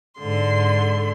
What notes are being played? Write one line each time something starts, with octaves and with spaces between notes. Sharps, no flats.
G#2 D3 C6